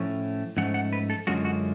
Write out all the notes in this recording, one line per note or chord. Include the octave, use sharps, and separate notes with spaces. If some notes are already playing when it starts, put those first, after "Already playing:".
Already playing: A2 F3 A3 C#4
G#2 F3 A3 C#4 F#5
F#5
B4
A4
F#2 D3 G#3 C#4 F4 F#4
F#4